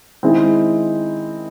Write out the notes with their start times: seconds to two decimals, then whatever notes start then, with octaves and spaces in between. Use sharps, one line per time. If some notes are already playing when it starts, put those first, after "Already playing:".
0.23 D#3 G#3 C4 E4